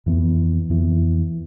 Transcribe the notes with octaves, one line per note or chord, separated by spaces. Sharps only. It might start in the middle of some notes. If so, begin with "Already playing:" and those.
F2 E3 B3
F2 E3 B3